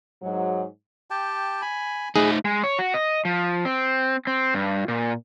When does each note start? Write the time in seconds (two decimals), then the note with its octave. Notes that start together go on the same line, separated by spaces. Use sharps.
0.23 G#2 F#3
1.10 G4 G5 A5
1.62 G#5 B5
2.16 A3 D#4 G#4 B4
2.45 G#3
2.64 C#5
2.79 F#4
2.94 D#5
3.25 F3
3.65 C4
4.27 C4
4.54 G2
4.88 A#2